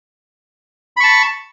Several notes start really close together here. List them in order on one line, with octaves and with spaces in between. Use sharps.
B5 C#6 A5